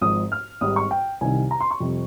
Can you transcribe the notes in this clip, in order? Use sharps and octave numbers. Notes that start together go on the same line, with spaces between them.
G#1 G#2 F3 D#6
F6
G#1 G#2 G3 D#6
C#6
G5
C2 C3 D#3 G#5
A#5
C6
C#6
F2 C3 G3